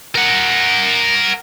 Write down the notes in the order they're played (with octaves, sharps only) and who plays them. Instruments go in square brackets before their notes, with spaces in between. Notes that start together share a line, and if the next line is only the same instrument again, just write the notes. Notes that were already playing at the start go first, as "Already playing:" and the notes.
[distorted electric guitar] A#4 F#5